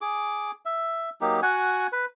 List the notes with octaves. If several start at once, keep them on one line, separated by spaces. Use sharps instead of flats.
G#4 D6
E5
F#3 A#3 D#4 G4
F#4 F#5 G#5
B4